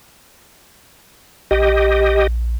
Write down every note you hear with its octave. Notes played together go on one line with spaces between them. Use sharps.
A#1 G4 D#5